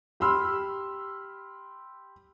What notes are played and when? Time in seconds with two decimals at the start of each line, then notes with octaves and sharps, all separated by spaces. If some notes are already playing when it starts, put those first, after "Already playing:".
0.20 G4 B5 C6 E6 F6